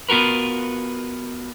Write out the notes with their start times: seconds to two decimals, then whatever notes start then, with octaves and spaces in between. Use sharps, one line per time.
0.09 B3 F4 F#4 A#4 B4